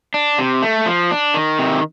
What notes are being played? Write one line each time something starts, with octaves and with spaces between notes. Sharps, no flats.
D4
C3
A3
F3
D4
D#3
C3